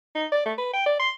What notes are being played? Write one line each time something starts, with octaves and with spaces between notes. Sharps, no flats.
D#4
D5
A3
B4
G5
D5
C6